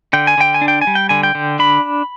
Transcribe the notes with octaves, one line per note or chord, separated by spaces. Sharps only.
D3 G5
G#5
D3 G5
G#5
D4
G5
G#5
G3
G5
D3 G#5
G5
D3
D4 B5